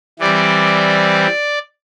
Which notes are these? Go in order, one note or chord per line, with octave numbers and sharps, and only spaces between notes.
E3 G3 C4 D5